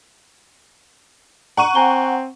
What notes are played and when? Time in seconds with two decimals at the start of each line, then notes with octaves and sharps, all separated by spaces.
1.57 F#5 A#5 C#6 D#7
1.75 C4 G#5 A#5 G7